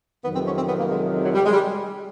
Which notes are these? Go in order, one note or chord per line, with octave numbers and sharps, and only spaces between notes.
F2 C3 D#3 F#3 B3
C4
C#4
C4
B3
A#3
G#3
F#3
G3
G#3
G3